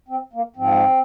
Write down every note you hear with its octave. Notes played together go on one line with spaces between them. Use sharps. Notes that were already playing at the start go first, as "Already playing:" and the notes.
C4
A#3
G#2 F3 C4